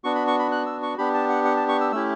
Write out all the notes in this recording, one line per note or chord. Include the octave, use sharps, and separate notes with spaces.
B3 D4 F#4 C#6
B5
C#6
B5
F#6
E6
C#6
B3 D4 G4 B5
A5
F#5
F#5
A5
C#6
E6
A3 C#4 E4 G4 E6